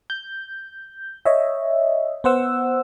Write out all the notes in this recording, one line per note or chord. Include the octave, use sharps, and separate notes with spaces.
G6
C#5 D#5 E5
B3 C5 F#5 E6